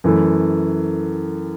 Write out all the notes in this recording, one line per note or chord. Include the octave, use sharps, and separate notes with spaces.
F#2 E3 A3